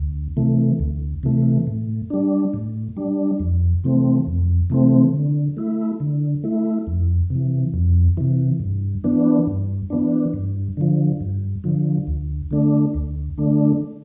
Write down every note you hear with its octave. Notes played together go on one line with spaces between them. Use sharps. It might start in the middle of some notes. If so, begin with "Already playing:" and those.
Already playing: D2
C3 E3 A3
D2
C3 E3 A3
A2
G3 D4
A2
G3 D4
F2
C3 E3 A3 C4
F2
C3 E3 A3 C4
D3
A3 E4
D3
A3 E4
F2
C3 E3
F2
C3 E3
G2
E3 B3 D4
G2
E3 B3 D4
G2
D3 F3
G2
D3 F3
D2
D3 A3 D4
D2
D3 A3 D4